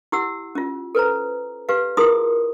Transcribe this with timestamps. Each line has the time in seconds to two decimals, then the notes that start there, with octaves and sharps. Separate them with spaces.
0.12 E4 G4 F#5 E6
0.55 C#4 F4
0.95 A4 B4 C5 A#5
1.69 G4 B4 F5
1.97 E4 F4 G#4 A#4 C6 D#6